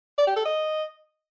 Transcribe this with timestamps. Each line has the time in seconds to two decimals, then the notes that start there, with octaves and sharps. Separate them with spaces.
0.18 D5
0.27 G4
0.36 A4
0.45 D#5